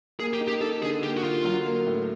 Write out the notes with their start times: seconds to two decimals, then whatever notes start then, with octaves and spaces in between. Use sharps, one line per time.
0.20 A#3 G#4
0.33 G4
0.40 D#4
0.48 G4
0.61 D#4 A4
0.82 D3 G#4
1.02 A#3 G4
1.17 F#4
1.23 D3 F4
1.44 F#3
1.66 A#3
1.86 A2